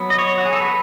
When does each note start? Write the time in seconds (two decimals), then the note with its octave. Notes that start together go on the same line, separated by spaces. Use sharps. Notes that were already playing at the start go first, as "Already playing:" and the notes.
Already playing: F#3 B3
0.10 D#5
0.19 C#5
0.38 F#4
0.45 G#4
0.53 A4
0.60 B4